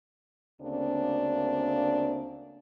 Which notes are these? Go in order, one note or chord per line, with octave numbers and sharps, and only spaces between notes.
D2 C#3 A#3 C4 D4